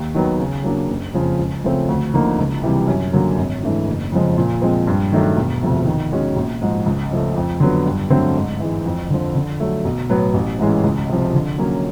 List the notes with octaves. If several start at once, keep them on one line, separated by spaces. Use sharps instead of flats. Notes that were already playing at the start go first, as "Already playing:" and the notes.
Already playing: D#2
D#3 F#3 B3
C#3
F#3 A#3 D4
F#1
F2 C#3 F3
C#2
C#3 F3 A3 C4
D2
D3 F3 A#3 D#4
C#2
C3 E3 G3
F#2
D3 F#3 A#3
G#1
G#2 E3 A3 D4
F#1
F2 C#3 F3 G#3
A#2
F3 G#3 C4
G2
D#3 F#3 A3 D4
E1
D2 C3 F3 A3
D#3
G#3 C#4 F#4
A#1
G#2 F3
C#2
C#3 F3 A3
F2
D3 F#3 B3
G2
D3 F#3 A3 C4
G#2
E3 G#3
F2
D3 F3
D3
F#3 A3
B1
A2 F#3 B3
A1
G#2 E3 G#3 C#4
C#2
C3 F3
D3
F#3 A#3 C#4